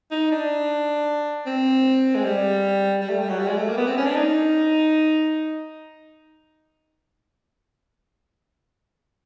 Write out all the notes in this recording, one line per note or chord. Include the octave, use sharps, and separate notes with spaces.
D#4
D4
C4
G#3
G3
G3
A3
G3
F#3
G3
G#3
A3
A#3
B3
C4
C#4
D4
D#4